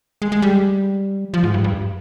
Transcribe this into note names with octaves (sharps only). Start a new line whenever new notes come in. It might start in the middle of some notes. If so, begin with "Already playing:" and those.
G#3
G#3
G3
F3
G#2
G2
G2